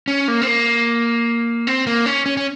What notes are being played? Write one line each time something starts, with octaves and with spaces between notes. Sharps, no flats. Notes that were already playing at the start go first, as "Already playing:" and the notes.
C#4
A#3
C4
A#3
C4
A#3
C#4
C#4
C#4